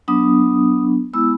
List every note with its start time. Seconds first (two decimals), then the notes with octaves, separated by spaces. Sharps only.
0.08 F#3 B3 D4 D#6
1.13 G#3 B3 E4 E6